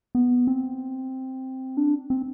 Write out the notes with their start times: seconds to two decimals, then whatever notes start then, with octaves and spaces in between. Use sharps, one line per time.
0.15 B3
0.47 C4
1.77 D4
2.10 C4